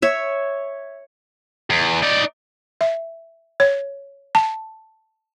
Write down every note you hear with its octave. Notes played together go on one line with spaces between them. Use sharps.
C#5 E5
E2
D#4 D5
E5
C#5
A5